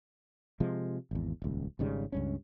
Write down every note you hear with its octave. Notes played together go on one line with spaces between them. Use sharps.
C3 F3 G#3
G#1 E2
D#1 C#2
G#1 G#2 C#3 G3
C#2 G2 C#4